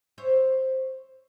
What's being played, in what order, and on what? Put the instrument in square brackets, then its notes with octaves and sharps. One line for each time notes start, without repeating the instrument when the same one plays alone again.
[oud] C5 C#5 E5